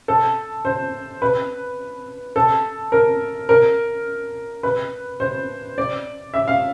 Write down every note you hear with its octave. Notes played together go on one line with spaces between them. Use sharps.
A4
C5
B4
A4
A#4
A#4
B4
C5
D5
E5
F5